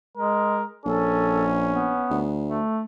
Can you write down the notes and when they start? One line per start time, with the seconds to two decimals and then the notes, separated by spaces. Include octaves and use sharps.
0.18 G#3 A#4
0.86 A#1 C#4 A4
1.69 B3
2.10 D2
2.45 A3